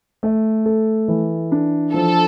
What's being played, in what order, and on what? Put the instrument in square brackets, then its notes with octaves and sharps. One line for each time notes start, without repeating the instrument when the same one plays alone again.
[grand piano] A3
A4
E3
D4
[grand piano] F3 [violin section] A4